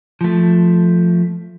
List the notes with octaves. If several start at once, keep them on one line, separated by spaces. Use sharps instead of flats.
F3 A3